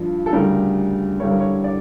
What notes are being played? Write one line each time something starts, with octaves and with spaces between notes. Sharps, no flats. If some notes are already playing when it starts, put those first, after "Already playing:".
Already playing: G2 F3
A4
D2 C#3 G3 A#4
G2 D3 G3 C#5
A#4
C#5
D5